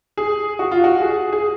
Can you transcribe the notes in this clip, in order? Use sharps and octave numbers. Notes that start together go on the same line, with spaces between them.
G#4
F#4
F4
F#4
G#4
G#4